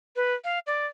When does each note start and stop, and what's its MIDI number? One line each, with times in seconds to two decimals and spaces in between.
0.16 0.34 71
0.44 0.59 77
0.67 0.86 74